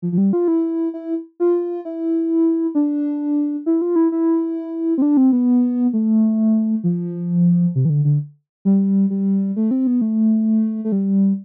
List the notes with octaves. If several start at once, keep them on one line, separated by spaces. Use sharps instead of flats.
F3
F3
G3
F4
E4
E4
F4
E4
D4
E4
F4
E4
E4
C4
D4
C4
B3
A3
F3
C3
E3
D3
D3
G3
G3
A3
C4
B3
A3
A3
G3